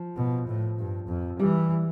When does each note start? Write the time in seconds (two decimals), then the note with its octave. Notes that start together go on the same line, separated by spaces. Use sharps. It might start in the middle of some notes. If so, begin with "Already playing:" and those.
Already playing: F3
0.16 B2
0.47 A2
0.78 G2
1.08 F2
1.39 E3 G3